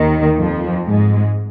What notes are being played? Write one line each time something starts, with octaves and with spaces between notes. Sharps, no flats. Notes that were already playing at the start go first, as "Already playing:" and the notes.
Already playing: D#2 D#3
F2 F3
G#2 G#3